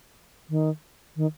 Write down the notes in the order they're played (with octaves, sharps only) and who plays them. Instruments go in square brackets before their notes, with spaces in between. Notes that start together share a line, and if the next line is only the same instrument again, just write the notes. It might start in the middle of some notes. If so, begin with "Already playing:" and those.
[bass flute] D#3
D#3